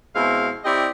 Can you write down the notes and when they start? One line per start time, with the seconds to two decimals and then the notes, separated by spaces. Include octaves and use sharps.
0.15 B2 G#3 C4 E4 F5
0.65 C4 E4 G4 D5 D#5